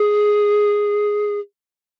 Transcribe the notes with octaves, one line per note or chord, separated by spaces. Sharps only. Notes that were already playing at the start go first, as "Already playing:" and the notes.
Already playing: G#4